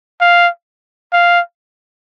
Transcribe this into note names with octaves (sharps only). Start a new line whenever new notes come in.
F5
F5